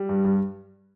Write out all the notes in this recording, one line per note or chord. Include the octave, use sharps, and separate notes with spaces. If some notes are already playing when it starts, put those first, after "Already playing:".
Already playing: G3
G2
G2